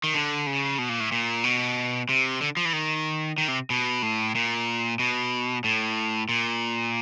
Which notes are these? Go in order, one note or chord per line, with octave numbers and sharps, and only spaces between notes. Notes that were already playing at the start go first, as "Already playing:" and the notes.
D#3
D3
C#3
B2
A#2
A2
A#2
B2
C3
D3
F3
E3
D#3
D#3
C3
B2
A2
A#2
B2
A2
A#2